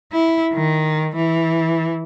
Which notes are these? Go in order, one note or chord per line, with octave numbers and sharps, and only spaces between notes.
E4
D#3
E3